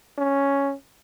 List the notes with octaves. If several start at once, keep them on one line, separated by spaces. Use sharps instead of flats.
C#4